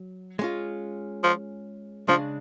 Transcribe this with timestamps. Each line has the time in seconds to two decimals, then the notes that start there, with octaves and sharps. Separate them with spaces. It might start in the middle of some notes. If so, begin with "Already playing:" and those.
Already playing: F#3
0.39 G#3 C#4 F4
1.24 F3
2.08 C#3 F3 G#3 D4